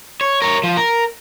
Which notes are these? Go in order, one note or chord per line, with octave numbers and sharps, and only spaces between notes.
C#5
A#4 C#5
F3
A#4